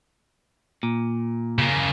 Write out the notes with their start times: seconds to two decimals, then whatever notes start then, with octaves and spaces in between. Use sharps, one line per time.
0.83 A#2
1.58 C#3 A#3